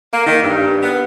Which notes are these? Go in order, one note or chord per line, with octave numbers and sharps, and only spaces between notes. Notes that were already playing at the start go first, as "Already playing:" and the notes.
A#3
D#3
G2
B3